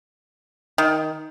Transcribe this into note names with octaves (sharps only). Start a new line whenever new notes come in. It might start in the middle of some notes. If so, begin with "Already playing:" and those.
D#3